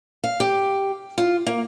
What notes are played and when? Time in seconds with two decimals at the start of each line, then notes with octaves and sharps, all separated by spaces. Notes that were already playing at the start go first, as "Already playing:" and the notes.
0.24 F5
0.40 G4
1.18 F4
1.46 A#3